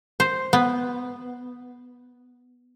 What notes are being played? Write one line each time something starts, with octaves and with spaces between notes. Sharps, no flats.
C5
B3